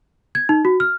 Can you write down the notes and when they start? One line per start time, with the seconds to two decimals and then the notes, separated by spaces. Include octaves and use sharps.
0.35 G#6
0.49 D#4
0.65 F#4
0.80 F6